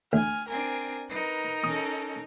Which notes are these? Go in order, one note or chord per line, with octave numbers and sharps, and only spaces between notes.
D2 G#5 F6
C4 D4 A#4 G#5
D#4 A#4 B4
C#4 A4 D#6